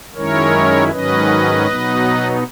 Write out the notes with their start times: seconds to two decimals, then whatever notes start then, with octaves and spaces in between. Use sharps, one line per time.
0.15 F#2 D#3 G#3 C#4 E4 A#4 C#5
0.91 G#2 D#3 F#3 C#4 B4 D#5
1.67 B2 F#3 B3 D#4